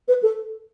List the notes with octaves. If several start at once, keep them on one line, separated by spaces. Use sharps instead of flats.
B4
A4